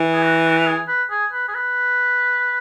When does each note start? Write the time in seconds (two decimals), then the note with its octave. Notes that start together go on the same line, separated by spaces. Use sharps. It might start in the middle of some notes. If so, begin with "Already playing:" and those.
Already playing: E3
0.13 G#4
0.22 F#4
0.45 F#4
0.57 B4
0.66 G#4
0.88 B4
1.10 G#4
1.33 B4
1.48 G#4
1.55 B4